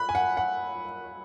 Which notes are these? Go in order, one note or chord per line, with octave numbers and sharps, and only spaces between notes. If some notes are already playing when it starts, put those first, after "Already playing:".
Already playing: B5 F#6
G#5
F#5
F#5